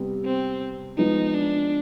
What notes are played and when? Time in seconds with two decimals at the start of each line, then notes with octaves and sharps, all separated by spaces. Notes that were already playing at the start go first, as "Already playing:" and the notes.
Already playing: C3 G3 B3
0.25 C4
0.97 F3 G#3 B3 D#4
1.35 D4